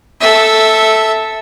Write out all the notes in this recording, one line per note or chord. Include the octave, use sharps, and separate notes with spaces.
A4 E5